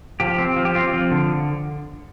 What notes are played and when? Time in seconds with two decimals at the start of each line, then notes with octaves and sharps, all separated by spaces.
0.20 F3 G4
0.39 C4
0.56 F3
0.65 G4
0.75 C4 F4
0.94 F3
1.11 D3